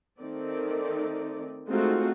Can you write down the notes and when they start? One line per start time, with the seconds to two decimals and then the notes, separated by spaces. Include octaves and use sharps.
0.19 D#3 A3 C4 D#4 D5
1.67 G#3 A3 C4 D#4 F4 F#4